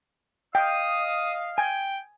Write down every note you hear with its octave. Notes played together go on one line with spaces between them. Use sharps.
D#5 F5 G5 D#6
G5 G#5